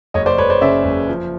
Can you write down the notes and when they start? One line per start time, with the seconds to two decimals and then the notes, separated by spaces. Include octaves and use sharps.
0.14 F#1 C#5 D#5
0.26 C5 D5
0.38 F#1 B4 C#5
0.50 C5 D5
0.61 C#3 D5 E5
0.85 F#1
1.09 F3